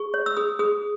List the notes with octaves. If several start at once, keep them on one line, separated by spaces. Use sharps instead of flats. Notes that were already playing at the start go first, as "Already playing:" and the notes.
Already playing: G#4 C#6
C#5
E6
G#4 D#6
G#4 D#6